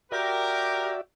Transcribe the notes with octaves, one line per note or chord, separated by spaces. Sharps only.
F#4 G4 A#4 D5 E5